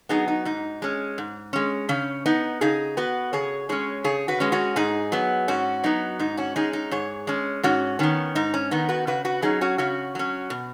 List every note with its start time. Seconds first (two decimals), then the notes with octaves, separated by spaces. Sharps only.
0.09 F#3 B3 D#4 G#4
0.28 D#4
0.45 G#2 D#4
0.82 G#3 C#4
1.18 G#2
1.53 G#3 C#4
1.89 C#3 C#4
2.26 B3 D#4
2.61 C#3 D#4 G#4
2.97 B3 F#4 B4
3.33 C#3 G#4 C#5
3.69 G#3 C#4 G#4 C#5
4.04 C#3 G#4 C#5
4.28 F#4 B4
4.40 G#3 C#4
4.52 C#4 F#4
4.76 G#2 D#4 G#4
5.12 F#3 B3
5.48 G#2 C#4 F#4
5.84 F#3 B3 D#4
6.19 G#2 D#4
6.37 C#4 F#4
6.56 G#3 C#4 D#4 G#4
6.73 D#4
6.91 G#2 G#4 C#5
7.27 G#3 C#4
7.63 G#2 C#4 F#4
7.99 D#3 B3 C#4
8.35 G#2 D#4
8.54 C#4
8.71 D#3 B3 D#4
8.89 F#4 B4
9.07 C#3 F#4 B4
9.25 F#4 B4
9.42 F#3 C#4 D#4 G#4
9.61 C#4 F#4
9.78 C#3 C#4 F#4
10.15 F#3 C#4
10.50 B2